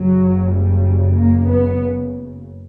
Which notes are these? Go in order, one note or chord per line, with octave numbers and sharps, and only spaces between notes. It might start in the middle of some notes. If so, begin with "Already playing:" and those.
Already playing: F#1 F#2 C#3 F#3
G3
A#3
B3